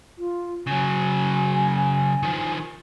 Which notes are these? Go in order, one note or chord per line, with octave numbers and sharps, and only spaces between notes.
F4
C#3 F#3 G#5
D#3 F3